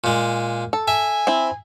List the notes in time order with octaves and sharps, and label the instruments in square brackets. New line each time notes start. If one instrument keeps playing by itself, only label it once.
[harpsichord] A#2 G#3
[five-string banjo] A4
[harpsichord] E5 [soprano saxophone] G#5
[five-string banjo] C4 E4